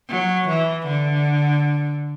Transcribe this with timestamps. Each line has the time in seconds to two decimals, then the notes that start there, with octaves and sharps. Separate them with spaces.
0.09 F#3
0.48 E3
0.87 D3